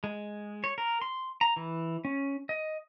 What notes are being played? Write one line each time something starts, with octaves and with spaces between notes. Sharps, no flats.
G#3
C#5
A#4
C6
A#5
E3
C#4
D#5